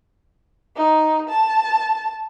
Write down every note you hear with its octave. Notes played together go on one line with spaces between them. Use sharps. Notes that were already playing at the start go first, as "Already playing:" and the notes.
D#4
A5